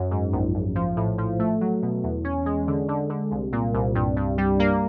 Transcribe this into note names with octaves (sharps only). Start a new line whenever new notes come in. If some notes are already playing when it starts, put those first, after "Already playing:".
Already playing: F#2
G#2
A#1
A#1
F3
A2
F3
A3
F#3
B2
E2
C#4
G#3
D3
D3
D3
C2
A#2
C2
G2
G2
G3
A#3